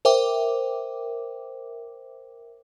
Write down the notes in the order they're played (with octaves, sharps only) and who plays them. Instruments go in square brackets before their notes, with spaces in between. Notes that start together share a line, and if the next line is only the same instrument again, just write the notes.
[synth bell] A#4 C5 E5 G5 D6